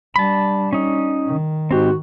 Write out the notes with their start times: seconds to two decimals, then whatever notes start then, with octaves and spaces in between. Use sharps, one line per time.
0.16 G3 D4 A5 B5
0.73 C#4 D#4
1.27 D#3
1.71 G#2 G#3 C4 F#4 G4